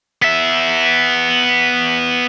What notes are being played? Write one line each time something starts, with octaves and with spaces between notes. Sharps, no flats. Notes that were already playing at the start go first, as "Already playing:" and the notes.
B3 E5